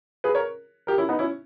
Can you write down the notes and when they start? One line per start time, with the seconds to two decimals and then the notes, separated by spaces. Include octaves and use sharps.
0.24 G#4 B4
0.35 A#4 C#5
0.87 G4 A#4
0.98 C#4 E4
1.09 B3 D#4
1.19 C#4 E4